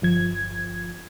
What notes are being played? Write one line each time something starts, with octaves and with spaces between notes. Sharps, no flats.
G1 F3 G#6